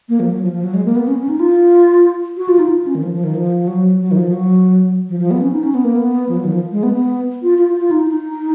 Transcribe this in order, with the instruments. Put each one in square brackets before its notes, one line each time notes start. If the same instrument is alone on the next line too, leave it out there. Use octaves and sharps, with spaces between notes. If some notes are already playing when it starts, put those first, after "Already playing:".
[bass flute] A#3
F3
F#3
F3
F3
F#3
G#3
A#3
B3
C#4
C#4
D#4
F4
F#4
F4
D#4
F4
C#4
D#3
F3
F3
D#3
F3
F#3
F#3
D#3
F3
F#3
F3
F3
B3
C#4
D#4
C#4
B3
A#3
B3
F3
F#3
D#3
F3
G#3
B3
B3
F4
F4
F4
F4
D#4
D#4